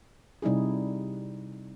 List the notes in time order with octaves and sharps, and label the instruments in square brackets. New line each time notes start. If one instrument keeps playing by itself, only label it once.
[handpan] C3 G3 D#4 E4 G#4